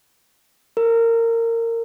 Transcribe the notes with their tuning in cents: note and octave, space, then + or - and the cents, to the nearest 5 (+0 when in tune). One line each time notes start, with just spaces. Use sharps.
A#4 -20